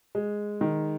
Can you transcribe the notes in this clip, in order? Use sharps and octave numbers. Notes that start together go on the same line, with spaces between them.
G#3
D#3